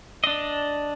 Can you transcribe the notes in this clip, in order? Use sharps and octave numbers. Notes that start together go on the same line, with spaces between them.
D4 D#5